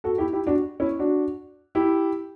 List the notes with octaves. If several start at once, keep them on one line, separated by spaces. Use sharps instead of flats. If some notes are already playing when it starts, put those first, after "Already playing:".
F#4 A4
E4 G4
E4 G4
D4 F#4
C#4 E4
D4 F#4
E4 G4